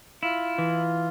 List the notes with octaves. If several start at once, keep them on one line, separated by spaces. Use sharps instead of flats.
E4 F4
E3